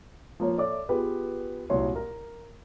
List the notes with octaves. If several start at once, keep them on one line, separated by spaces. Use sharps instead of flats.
F3 A#3 C#5
A4 C#5 D5 E5 D6
B3 F4 G4 G#4 B4
C2 A#2 F#3 E4 C#5 C6
A#4